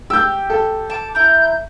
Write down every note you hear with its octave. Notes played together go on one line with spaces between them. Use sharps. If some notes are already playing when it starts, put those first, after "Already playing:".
G4 E6 G6
A4
A5 D6
E4 A#5 G6